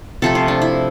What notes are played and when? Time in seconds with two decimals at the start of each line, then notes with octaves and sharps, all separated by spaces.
0.22 C3 F3 A3 A4
0.35 F4
0.48 D4
0.62 E4